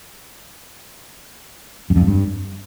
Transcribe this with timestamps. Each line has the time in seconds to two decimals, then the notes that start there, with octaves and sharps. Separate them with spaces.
1.90 F#2
1.96 F2
2.02 G#2
2.07 G2